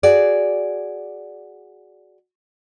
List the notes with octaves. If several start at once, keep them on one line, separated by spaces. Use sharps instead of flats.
F#4 G#4 D5